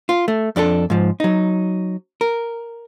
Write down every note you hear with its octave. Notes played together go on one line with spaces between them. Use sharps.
F4
A3
F2 D4 G4 A4
G#2 F3
F#3 D#4
A#4